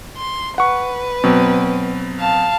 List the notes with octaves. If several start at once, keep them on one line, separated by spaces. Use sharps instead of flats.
C6
B4 F#5 C#6
B2 F#3 C4
F5 A5